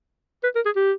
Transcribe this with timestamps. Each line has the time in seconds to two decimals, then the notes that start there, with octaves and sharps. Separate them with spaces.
0.43 B4
0.55 A#4
0.65 G#4
0.76 G4